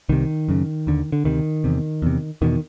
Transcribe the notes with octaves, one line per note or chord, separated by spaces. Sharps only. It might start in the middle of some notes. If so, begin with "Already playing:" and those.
C2 C3 D#3
F#2 C#3
D#2 D3
D3
D2 C3 D#3
E2 C3
E2 C3
E2 B2 D#3